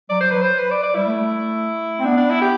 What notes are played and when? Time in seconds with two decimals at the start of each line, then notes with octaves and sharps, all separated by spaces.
0.09 F#3 D5
0.21 F#3 C5
0.31 F#3 B4
0.42 C5
0.59 B4
0.71 D5
0.83 D5
0.95 G3 E4
1.07 A3
1.99 C4
2.05 B3 D4
2.17 D4
2.30 E4
2.42 G4